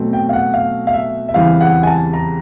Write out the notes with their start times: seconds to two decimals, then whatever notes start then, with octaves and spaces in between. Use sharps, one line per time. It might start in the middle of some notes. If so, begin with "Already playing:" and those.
Already playing: B2 F#3 A3 C4
0.13 G5
0.29 F5
0.33 F#5
0.53 F5
0.87 F5
0.93 E5
1.29 E5
1.34 E2 C#3 E3 G3 C4 F5
1.61 F#5
1.83 G#5
1.87 A5
2.14 A#5